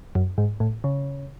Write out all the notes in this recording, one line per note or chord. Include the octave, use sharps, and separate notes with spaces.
F#2
G#2
A2
C#3